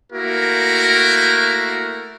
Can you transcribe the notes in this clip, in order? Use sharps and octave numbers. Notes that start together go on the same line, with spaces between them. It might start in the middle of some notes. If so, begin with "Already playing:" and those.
A3 A#3 E4 F#4 A#4